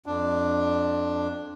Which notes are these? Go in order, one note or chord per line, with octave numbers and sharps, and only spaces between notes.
F2 D4